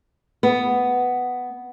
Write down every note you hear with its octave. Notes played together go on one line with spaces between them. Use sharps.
B3